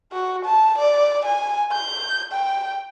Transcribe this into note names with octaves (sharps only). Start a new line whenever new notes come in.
F#4
A5
D5
G#5
G6
G5